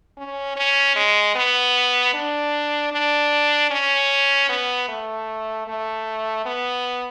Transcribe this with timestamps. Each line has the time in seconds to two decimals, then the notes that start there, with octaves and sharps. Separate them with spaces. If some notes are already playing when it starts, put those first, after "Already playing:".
0.17 C#4
0.57 C#4
0.96 G#3
1.35 B3
2.14 D4
2.92 D4
3.71 C#4
4.49 B3
4.89 A3
5.67 A3
6.45 B3